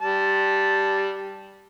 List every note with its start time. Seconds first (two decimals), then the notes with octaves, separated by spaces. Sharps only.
0.01 G3 A5